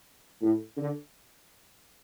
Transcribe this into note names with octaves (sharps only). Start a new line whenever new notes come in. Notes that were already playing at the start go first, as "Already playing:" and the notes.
A2
D3